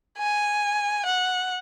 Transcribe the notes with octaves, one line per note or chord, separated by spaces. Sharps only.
G#5
F#5